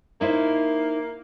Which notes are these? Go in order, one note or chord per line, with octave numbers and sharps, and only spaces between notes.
A#3 D#4 E4 C5